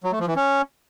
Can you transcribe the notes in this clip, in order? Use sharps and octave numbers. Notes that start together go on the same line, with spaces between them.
F#3
A3
F3
E3
C#4